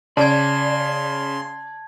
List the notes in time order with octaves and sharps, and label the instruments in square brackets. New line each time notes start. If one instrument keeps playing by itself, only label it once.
[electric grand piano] C#3 [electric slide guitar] D5 [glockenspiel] A5 G#6 [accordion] C6